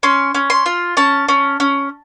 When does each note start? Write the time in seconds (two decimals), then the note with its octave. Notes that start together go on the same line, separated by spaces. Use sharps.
0.03 C#4 C6
0.35 C#4
0.50 C6
0.66 F4
0.97 C#4 A5
1.28 C#4
1.60 C#4